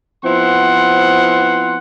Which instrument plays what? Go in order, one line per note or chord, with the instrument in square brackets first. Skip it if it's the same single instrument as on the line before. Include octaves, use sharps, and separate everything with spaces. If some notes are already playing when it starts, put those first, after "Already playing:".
[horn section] F3 B3 C4 E4 F#5 C6